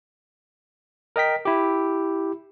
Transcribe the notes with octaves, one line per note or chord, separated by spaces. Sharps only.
A#4 D#5 G5 B6
E4 G4